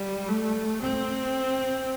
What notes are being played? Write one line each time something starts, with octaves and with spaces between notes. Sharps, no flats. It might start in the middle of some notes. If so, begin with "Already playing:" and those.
Already playing: G3
A3
C4